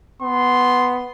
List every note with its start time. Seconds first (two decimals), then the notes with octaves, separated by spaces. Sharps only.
0.22 B3 C6